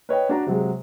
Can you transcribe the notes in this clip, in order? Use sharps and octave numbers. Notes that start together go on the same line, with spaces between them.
B4 C#5 D#5 G5
D4 F#4 D5 A#5
C3 F#3 G#3